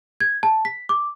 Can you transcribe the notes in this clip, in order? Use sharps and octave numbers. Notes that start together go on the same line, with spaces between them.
G#6
A5
B6
D6